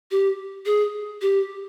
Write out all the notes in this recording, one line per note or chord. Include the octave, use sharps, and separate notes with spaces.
G4
G#4
G4